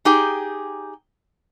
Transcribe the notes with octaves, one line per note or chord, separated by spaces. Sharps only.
D#4 G4 G#4 G5